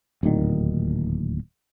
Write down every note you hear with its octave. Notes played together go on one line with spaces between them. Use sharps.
D1 D#2 A#2 D#3